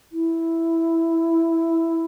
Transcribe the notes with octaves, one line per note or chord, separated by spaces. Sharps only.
E4